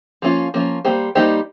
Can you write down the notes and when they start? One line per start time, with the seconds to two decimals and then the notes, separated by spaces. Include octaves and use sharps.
0.22 F3 A#3 C#4 F4
0.54 F3 A#3 C#4 F4
0.84 G3 A#3 D#4 G4 C5
1.15 G3 A#3 D#4 G4 C5